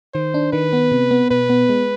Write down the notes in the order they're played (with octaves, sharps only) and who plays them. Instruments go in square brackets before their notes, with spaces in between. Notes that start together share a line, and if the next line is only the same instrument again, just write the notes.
[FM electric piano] D#3 [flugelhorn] C5
[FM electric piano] D4
[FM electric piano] D#3 [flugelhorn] B4
[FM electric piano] B3
C3
B3
[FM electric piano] B2 [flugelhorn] B4
[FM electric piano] B3
G#3